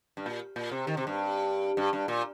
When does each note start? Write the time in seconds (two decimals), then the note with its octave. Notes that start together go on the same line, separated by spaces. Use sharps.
0.17 G2
0.26 A#2
0.56 A#2
0.71 C3
0.87 D#3
0.97 C3
1.07 G2
1.77 G2
1.93 G2
2.08 A#2